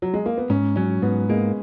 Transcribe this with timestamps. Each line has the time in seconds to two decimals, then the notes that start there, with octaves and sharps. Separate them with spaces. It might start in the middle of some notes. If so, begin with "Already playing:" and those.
0.02 F#3
0.14 G#3
0.26 A#3
0.38 B3
0.50 G#2 C#4
0.76 F#3 C#4
1.02 G#2 B3
1.29 G#3 A#3